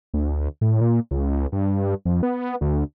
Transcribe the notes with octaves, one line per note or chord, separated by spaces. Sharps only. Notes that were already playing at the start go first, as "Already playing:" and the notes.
D2
A2
A#2
C#2
G2
F2
B3
D2